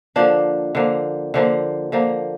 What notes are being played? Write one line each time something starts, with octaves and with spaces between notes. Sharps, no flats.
D3 F3 A#3 D4
D3 F3 A#3
D3 F3 A#3
D3 F3 A#3